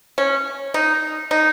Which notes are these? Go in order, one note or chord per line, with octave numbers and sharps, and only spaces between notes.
C#4
D#4
D#4